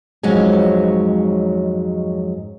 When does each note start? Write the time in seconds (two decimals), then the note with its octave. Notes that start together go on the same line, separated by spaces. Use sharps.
0.23 F2 G#2 F#3 G#3 C#4